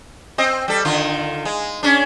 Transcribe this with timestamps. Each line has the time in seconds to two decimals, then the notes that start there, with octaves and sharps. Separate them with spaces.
0.38 C4 D#5
0.68 G3 A4
0.85 D3 D#3 F4
1.45 G#3
1.83 C#4 D4